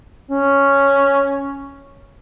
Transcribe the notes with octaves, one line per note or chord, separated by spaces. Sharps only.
C#4